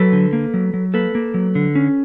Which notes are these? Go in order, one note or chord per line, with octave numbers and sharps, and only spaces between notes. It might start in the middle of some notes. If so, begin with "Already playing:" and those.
Already playing: F#3 A4 B4
D3
A#3
F#3
F#3
A#3 A4 B4
A#3
F#3
D3
C#4